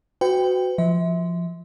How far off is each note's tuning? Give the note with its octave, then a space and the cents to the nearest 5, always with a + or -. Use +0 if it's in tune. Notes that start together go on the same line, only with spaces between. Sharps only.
F#4 +0 B4 +40 G5 +0
F3 -10 E5 -30